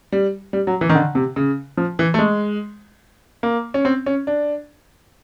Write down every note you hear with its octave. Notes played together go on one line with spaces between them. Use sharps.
G3
G3
F#3
E3
D#3
D3
C3
C#3
F3
E3
A3
G#3
A#3
C#4
C4
C#4
D4